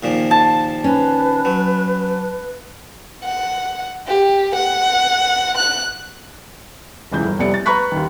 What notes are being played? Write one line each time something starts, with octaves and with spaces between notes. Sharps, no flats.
D#2 A#2 F3
A5
C#4 B4
F#3
F#5
G4
F#5
F#6
E1 C#2 E3 G6
G1
F1 C2 B3 G4 D5 C#7
A6
B4 A#5 B5 C#6 F#6 B6
D#2 D#3